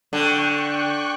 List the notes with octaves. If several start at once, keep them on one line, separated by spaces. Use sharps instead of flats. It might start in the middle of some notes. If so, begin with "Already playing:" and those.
D3 G5 C#6 F#6